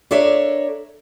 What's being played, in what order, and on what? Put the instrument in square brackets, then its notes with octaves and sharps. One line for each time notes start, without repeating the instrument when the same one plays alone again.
[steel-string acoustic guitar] D4 A4 A#4 C#5 D5 E5